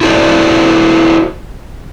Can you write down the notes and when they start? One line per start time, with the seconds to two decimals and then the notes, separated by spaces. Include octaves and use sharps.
0.01 E4 F#4 A4 C5 D5